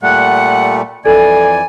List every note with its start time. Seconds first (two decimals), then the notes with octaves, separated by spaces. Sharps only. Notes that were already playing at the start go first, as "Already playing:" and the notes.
0.02 A#2 G3 A3 F#5
1.05 F2 E3 A4 D5 G#5